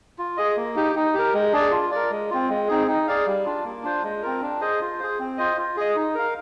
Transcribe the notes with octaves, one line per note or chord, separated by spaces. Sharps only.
F4
G#4 D#5
A#3
D#4 G4
D#4
G4 A#4
G#3
D4 G#4 D5
F4
A#4 D5
G#3
C4 F4
G#3
C4 D#4 G#4
D#4
G#4 D5 F5
G3
D4 F4
A#3
D4 F4 C5
G#3
C4 F4 A#4
D4
G#4 C5 D#5
F4
G#4 C5
C4
F4 C5 D#5
F4
G#4 D#5
D#4
A#4 F5